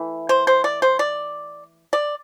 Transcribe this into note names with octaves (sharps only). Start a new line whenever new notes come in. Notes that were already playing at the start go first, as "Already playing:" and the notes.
Already playing: E3 A3
C5
C5
D5
C5
D5
D5